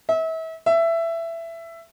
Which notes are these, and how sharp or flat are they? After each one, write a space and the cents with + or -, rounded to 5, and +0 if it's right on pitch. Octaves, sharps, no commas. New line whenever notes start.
E5 -35
E5 +15